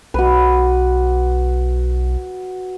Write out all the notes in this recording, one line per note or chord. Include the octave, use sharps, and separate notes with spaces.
B1 F#4 B4